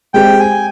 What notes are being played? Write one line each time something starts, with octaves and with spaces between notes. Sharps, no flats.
G#3 C4 G4 G5
G#5